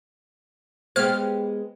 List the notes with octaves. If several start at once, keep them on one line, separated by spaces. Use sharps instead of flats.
G#3 B3 G4 C5 F6